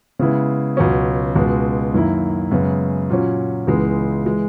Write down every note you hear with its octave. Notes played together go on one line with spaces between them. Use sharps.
C#3 G#3 B3 E4
C#2 B2 F#3 C#4
C#2 B2 G#3
F#2 D#3 A#3 E4
F#2 C#3 G#3 B3
A#2 F#3 C#4
C#2 C#3 E3 G#3 B3
E3 G#3